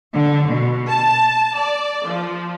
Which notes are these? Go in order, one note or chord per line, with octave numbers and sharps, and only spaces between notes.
D3
B2
A5
D5
F3